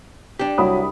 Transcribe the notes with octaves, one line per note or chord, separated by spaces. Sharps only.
D4 G4
C2 F#3 B5 D#6